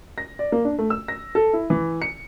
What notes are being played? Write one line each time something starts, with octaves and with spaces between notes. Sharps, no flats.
A#6
D5
A#3
D4
A3
E6
A#6
A4
E4
E3
C#7